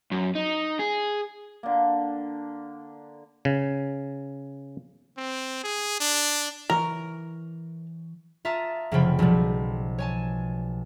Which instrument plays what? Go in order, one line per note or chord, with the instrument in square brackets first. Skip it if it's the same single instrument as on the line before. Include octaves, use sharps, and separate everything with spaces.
[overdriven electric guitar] F#2
D#4
G#4
[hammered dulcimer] D3 A#3
[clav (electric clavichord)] C#3
[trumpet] C4
G#4
D4
[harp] E3 C#5 [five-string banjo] A#4
[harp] F4 E5 A5 A#5 D#6
F1 C#3 E3 F3 G5 B5
B1 B2 F3 G3
C#5 G#5 A5